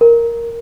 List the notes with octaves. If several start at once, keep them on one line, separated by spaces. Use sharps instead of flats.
A#4